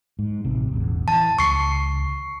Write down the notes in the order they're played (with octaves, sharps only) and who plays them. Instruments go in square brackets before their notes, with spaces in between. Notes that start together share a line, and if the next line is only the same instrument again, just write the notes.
[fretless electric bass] G#2
A1 C3
E1 A1 E2
[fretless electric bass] E3 [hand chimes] A5
[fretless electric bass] C#2 [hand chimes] C#6 C7